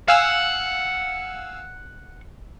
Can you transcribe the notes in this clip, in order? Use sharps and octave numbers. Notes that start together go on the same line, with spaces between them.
F5 F#5 G#5 E6